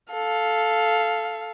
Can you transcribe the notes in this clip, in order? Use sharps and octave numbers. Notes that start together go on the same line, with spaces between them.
A4 F5